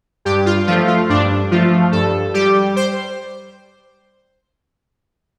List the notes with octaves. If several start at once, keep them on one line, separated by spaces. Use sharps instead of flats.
G2 G4
F4
F3 A3 F4
F4
G2 D4
F3 A3 F4
G2 A4
G3 G4
C5